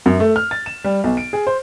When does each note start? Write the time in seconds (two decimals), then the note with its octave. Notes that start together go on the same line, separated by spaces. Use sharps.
0.06 F#2
0.20 A3
0.36 F6
0.51 A6
0.66 E7
0.84 G3
1.04 B1
1.17 D7
1.33 G#4
1.47 C5